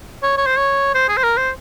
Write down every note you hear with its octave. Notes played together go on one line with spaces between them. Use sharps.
C#5
C#5
C5
C#5
C5
G#4
C5
A#4
C5